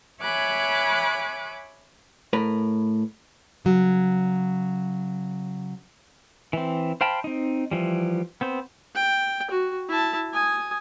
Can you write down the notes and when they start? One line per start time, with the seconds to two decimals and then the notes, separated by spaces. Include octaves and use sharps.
0.22 C#5 E5 G#5 B5 D6 F#6
2.33 A2 A#4 B4
3.65 C#3 F#3
6.53 E3 C4
7.01 C5 F5 G5 A5 B5
7.24 C4 D#4
7.71 E3 F3 G3
8.41 B3 C4 C5
8.95 G5
9.51 F#4
9.89 E4 A5
10.33 G#5 D#6